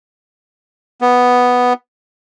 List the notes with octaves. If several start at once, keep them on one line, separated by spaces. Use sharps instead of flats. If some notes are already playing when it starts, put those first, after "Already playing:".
B3